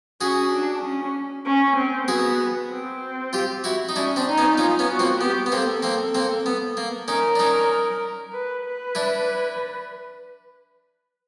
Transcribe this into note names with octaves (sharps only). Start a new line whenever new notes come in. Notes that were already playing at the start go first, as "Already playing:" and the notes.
C#4 F#4 G#4
D4
C#4
C#4
C4
B3 F#4 G#4
C4
F4 G4
E4 F#4
D#4
C#4 D4 E4
C4 D4
D#4
B3 C#4
C#4 D#4 F4
B3 C#4
F#4
A#3 C4
B3 G4
B3
A#3 C4 A4
A#3 C4
A#3 C4
B3
A#3
C#4 D#4 A#4
D4
C#4 D#4
B4
B4
D4 E4